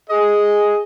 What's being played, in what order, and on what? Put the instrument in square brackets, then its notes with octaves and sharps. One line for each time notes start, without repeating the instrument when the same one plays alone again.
[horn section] G#4 D#5